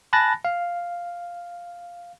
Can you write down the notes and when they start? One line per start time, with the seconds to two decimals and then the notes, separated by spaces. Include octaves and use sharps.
0.13 G#5 A5 B5 F#6 A6 A#6
0.45 F5